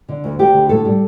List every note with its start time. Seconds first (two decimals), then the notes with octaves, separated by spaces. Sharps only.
0.09 D3
0.24 D2
0.39 D2 G4
0.54 D3
0.69 A2 A4
0.85 G3